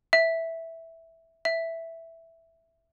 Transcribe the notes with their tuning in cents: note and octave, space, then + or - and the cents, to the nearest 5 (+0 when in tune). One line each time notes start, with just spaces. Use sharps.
E5 -5
E5 +0